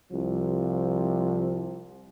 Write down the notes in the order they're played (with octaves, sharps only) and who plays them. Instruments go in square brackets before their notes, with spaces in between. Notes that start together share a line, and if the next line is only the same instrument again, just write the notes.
[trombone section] C2 F3